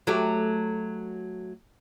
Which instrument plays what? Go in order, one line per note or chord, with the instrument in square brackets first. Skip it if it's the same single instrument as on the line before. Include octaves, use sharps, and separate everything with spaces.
[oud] F#3 A3 G4